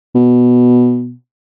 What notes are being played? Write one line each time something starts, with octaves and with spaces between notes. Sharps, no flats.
B2